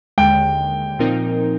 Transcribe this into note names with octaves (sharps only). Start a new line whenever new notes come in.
D#2 D3 G#3 G5
A#2 F3 C4 D#4 A#4